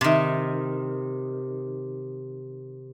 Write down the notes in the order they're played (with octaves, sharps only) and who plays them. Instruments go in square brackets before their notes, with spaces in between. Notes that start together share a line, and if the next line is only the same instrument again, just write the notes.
[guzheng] C3 D#3